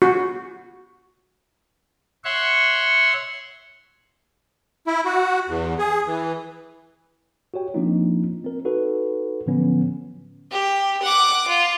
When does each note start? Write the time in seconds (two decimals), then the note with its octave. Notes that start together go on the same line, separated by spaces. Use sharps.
0.02 F#4
2.25 C#5 E5 F#5 C6 C#6
4.87 E4
5.05 F#4
5.48 E2
5.79 G#4
6.07 E3
7.54 F#4 G4 C#5 G5
7.74 F3 A#3 C4 D4 D#4 F4
8.44 C4 A#4
8.65 D#4 F#4 A4 B4
9.46 A2 D3 F3 F#3 B3 C#4
10.51 G4
11.02 F#5 D6
11.47 F4